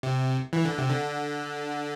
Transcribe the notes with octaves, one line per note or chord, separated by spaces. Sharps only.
C3
E3
D3
C3
D3